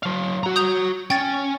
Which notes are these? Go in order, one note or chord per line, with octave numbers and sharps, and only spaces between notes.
F#3 F5
F#4 A#5
D#6 G6 F7
C#4 G5 A6